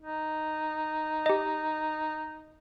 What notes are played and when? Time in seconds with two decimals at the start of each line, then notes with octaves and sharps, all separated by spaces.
0.01 D#4
1.26 G4 D#5